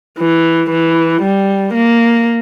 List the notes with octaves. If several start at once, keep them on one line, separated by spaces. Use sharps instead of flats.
E3
E3
G3
A#3